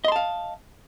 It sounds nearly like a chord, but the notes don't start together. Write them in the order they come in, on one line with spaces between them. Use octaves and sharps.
D#5 C6 A5 F5